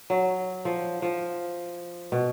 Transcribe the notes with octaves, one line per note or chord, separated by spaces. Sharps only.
F#3
F3
F3
B2